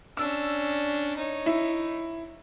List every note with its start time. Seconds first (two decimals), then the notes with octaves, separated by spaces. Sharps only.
0.17 C#4 D4 E6
1.17 D#4 C#5
1.46 E4